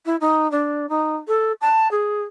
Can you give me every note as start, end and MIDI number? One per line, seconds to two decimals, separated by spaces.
0.06 0.16 64
0.21 0.50 63
0.51 0.89 62
0.89 1.16 63
1.28 1.52 69
1.61 1.90 81
1.91 2.22 68